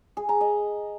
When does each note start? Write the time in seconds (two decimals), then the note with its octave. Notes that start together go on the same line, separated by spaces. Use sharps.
0.17 G#4
0.29 A#5
0.41 D#5